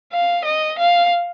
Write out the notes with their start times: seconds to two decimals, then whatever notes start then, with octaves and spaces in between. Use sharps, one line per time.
0.12 F5
0.45 D#5
0.79 F5